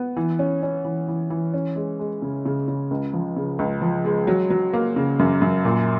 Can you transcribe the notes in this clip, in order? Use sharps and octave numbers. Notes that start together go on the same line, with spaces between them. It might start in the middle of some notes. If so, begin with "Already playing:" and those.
Already playing: B3
E3
C#4
C#4
E3
E3
E3
C#4
G#3
G#3
C#3
C#3
C#3
C#2
F3
C#3
C#2
F3
G#3
F#3
F#3
A#3
C#3
F#2
F#2
A#2